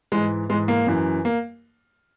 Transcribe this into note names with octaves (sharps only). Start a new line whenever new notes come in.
G#2 E3 G#3
G#2 E3 G#3
A#3
F#2 E3
A#3